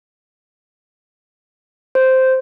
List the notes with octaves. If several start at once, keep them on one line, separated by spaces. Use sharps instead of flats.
C5